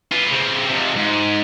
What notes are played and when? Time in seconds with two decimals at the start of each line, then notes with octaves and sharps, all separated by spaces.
0.12 F4 B4
0.31 C#3 C4
0.68 F2 C3
0.96 G#2